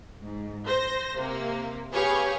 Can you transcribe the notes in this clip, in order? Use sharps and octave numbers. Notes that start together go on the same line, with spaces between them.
G#2
C5 A#6
C3 A#3
G4 G#4 B4 C#5 F5 C#6